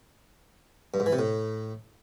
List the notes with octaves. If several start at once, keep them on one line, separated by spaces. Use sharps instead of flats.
G2
G#2
E3
C3
A2